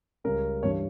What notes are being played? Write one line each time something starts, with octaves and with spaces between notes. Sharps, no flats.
C#2 C#3 G3 C#4 A#4
G2 E3 G3 D4 C#5